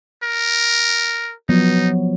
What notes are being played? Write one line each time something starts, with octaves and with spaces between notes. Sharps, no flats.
A#4
F3 F#3 B3 D#4